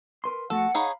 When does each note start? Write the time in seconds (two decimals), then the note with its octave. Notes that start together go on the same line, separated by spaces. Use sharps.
0.24 A#4 B4 C6
0.50 F2 A3 F#4 A4 F#5
0.75 D#4 G#4 C#5 F5 B5